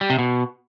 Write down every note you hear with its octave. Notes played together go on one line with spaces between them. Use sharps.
G3
C3
B2